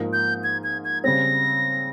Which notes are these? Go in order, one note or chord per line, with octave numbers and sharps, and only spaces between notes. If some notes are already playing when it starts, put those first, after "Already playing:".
Already playing: G#2 F3 A#3 D#4
G6
G#6
G#6
G#6
C#3 G3 C4 A#6